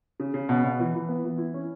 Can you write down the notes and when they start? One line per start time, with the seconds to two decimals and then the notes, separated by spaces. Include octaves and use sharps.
0.20 C#3
0.34 C#3
0.49 B2
0.64 B2
0.79 E3
0.94 E3
1.09 B3
1.24 E3
1.38 E4
1.54 C#4